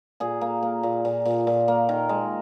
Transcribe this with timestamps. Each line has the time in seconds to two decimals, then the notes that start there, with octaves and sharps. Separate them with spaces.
0.20 A#2 G#4
0.41 A#3
0.63 A#3
0.83 A#2
1.05 A#2
1.25 A#2
1.47 A#2
1.68 A#3
1.89 D#3 A#4
2.09 G#3